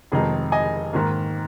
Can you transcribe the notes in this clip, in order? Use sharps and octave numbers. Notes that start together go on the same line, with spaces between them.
F1 F2 D#3 G#3 D#4 G#4
D#5 G#5
G#2 D#3 A#3